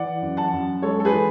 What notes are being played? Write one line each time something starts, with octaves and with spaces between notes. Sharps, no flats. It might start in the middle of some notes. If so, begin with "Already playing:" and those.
Already playing: E3 D5 F#5
F#2
F#5 A5
F#2
G#3 A4 C#5
A4
G#4 B4
E3